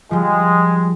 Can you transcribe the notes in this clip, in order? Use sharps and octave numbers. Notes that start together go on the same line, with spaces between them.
F3 G3 G#3